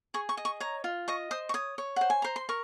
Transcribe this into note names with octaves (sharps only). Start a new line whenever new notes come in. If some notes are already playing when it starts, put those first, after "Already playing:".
G#4 C#6
C#6
D#5
C#6
C#5 A#5
F4
D#5 C#6
C5 D#6
C#6
C#5 D#6
C#5
C5 F#5
G#5
C5 A#5
C6
A#4 C#6